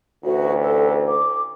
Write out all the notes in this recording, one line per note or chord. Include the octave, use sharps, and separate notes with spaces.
A1 D2 F#4
A4
D6